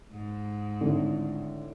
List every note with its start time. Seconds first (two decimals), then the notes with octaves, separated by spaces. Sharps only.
0.11 G#2
0.81 G#1 A2 D3